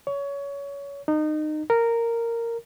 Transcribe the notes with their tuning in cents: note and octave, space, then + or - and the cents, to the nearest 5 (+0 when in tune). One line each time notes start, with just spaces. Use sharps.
C#5 +20
D#4 -25
A#4 -10